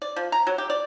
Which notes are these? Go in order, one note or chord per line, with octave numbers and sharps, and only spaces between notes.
D5
F3
A#5
F#3
G4
D5